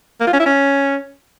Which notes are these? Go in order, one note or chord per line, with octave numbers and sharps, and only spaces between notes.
A#3
F4
C#4
E4
C#4